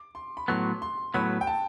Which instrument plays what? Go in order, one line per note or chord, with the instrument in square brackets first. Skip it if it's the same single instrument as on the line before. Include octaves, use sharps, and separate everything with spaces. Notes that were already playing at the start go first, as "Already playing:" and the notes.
Already playing: [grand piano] D6
C6
B5
[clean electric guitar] A2 F#3 B3 [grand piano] C6
[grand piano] C6
[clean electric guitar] A2 F#3 B3 [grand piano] B5
[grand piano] G5
A5